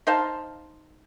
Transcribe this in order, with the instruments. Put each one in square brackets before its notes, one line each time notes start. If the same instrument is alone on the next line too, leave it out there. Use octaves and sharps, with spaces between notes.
[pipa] D#4 C5 F5 A5